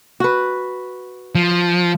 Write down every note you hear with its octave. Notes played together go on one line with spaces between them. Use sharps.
F#4 B4
F3